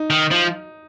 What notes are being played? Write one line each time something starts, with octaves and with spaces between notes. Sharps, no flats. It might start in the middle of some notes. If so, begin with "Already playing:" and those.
Already playing: D#4
D#3
F3